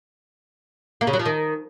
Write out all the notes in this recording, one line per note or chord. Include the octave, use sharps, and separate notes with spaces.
A#3
C#3
F#3
F3
D#3